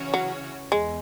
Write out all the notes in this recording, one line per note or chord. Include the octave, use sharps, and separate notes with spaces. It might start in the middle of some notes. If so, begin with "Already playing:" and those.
Already playing: C#3 E3 C#4 F#4 C#5
F#3
E2 G#3